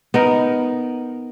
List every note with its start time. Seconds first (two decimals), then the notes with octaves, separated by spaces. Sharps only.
0.14 B3 D#4 A#4